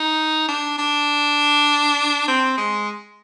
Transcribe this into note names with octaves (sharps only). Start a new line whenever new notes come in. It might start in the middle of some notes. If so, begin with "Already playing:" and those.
Already playing: D#4
D4
D4
C4
G#3